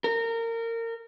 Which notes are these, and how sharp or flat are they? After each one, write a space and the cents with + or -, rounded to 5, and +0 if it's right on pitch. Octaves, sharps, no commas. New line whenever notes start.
A#4 -25